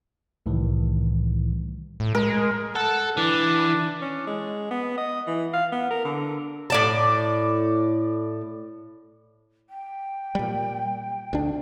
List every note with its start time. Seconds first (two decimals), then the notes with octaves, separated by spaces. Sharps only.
0.46 C2 A2 D#3 E3 G3
2.00 A2
2.15 G#3 A#4
2.76 A4 F#5
3.17 E3 D4
4.02 C#4
4.27 G#3
4.71 B3
4.98 D#5
5.27 E3
5.54 F5
5.72 B3
5.91 A#4
6.05 D3
6.70 A2 D5 A5
9.69 G5
10.35 A#2 G3
11.33 D2 D4